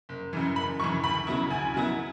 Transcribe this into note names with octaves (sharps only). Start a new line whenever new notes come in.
F#1
F#2 C#3 E3
F#1 B5
F#2 C#3 E3 C#6
D2 B5
C#3 F#3 B3 E4
D2 G#5
C#3 F#3 B3 E4